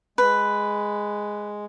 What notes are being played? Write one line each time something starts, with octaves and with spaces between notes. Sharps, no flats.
G#3 B4